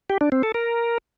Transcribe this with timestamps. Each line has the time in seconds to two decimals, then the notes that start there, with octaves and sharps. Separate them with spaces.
0.10 G4
0.21 D4
0.32 C4
0.43 A4
0.54 A#4